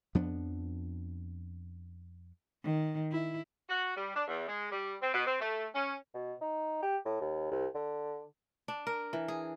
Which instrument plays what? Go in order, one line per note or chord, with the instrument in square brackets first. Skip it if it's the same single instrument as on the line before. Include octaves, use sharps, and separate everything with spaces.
[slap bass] F2 F3 B3 D4
[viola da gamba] D#3
E4
[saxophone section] F#4
G3
D4
E2
G#3
G3
C4
B2
C4
A3
C#4
[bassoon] B2
D#4
G4
A2
D#2
C2
D3
[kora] D4
A#4
E3
G#4